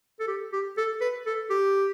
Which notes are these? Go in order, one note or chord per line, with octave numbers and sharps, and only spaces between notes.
A4
G4
G4
A4
B4
A4
G4